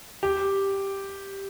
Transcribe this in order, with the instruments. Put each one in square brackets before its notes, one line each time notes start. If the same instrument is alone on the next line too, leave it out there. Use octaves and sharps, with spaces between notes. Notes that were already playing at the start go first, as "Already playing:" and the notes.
[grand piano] G4